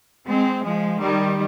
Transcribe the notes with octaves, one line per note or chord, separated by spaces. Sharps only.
G#3 C4
F3 G#3
D#3 G3